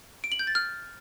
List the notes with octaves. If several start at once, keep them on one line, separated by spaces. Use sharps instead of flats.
D7
F#7
G6
A6
F6